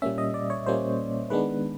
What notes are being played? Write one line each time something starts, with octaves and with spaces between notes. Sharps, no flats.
A#2 G3 A#3 C#4 E5
D#5
D5
C#5
A#2 G3 A#3 C#4 C5
D#3 G#3 B3 D4 B4